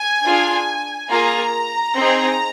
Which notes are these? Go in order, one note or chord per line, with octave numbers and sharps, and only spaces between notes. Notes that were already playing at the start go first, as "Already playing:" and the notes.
Already playing: G#5
D4 F4 G#4
A#3 F4 G#4 A#5
C4 D#4 G#4